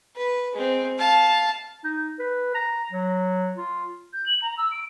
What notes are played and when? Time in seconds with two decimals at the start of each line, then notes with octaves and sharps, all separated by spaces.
0.16 B4
0.53 G#3 C4
0.98 F5 A5
1.84 D#4
2.19 B4
2.55 A#5
2.92 F#3
3.57 F4
4.13 G6
4.26 F#7
4.42 A#5
4.58 E6
4.71 D7